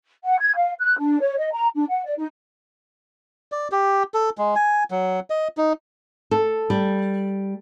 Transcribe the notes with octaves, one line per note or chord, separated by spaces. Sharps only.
F#5
G#6
F5
F#6
D4
C#5
D#5
A#5
D4
F#5
D5
D#4
D5
G4
A4
G#3
G#5
F#3
D#5
D#4
A4
G3